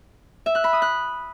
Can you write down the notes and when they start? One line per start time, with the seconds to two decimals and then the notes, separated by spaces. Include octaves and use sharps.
0.46 E5
0.55 F#6
0.64 B5
0.73 D#6
0.82 F#6